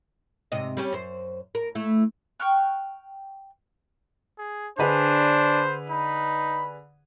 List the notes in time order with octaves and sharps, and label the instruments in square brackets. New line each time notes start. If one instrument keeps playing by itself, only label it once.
[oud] G#2 C3 D#5
G3 C#4 G4
F#2 C5
A#4
A3 E4
[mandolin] G5 C#6 F6 F#6
[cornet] G#4
[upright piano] D3 G#4 B4 [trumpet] D4 [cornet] C5
[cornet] D#4 [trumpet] B5